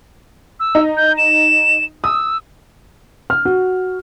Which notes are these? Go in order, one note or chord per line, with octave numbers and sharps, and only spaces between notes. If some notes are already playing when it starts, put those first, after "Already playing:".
E6
D#4
G6
E7
D#6 E6
F6
F#4